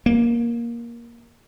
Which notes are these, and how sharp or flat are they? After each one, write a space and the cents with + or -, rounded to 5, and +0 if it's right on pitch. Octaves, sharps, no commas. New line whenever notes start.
A#3 +15